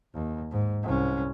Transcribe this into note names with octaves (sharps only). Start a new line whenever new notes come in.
D#2
G#2
C2 C#4